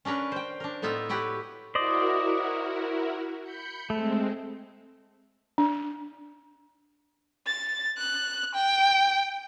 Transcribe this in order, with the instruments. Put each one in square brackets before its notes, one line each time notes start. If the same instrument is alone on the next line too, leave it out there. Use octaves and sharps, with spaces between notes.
[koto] C#4 D4 A#4 B4 C#5
C5 G5
D4 A#4
A2 B3 D#4 F4 E5
E4 F#4 G4 B4 C#5
[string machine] E4 F#4 A#4 [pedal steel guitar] C5 D5 D#5
[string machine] B5 G6 C#7
[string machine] G#3 C4 [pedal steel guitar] A3
[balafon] D4
[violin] A6
F#6
G5